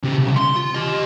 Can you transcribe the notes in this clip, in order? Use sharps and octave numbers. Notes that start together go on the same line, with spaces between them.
C#3 G4
C2 C#3
C6
F4
G4 D#5